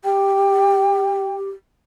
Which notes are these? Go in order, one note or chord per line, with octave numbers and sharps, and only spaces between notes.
G4 G5